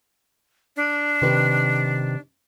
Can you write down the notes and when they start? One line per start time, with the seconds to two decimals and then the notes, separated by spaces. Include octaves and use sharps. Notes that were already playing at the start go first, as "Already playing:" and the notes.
0.76 D4
1.22 C3 D#3 B4